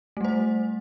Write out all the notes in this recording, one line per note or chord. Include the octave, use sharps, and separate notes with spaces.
G3 A3 C5